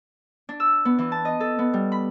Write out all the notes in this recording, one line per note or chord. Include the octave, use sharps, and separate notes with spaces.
D4
E6
B3
E3
A5
D#5
A4
B3
G3
B5